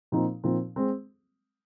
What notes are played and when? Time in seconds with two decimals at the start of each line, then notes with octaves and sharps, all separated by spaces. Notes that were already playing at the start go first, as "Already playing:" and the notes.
0.12 A#2 F3 C4 D#4
0.44 A#2 F3 C4 D#4
0.76 G#3 C4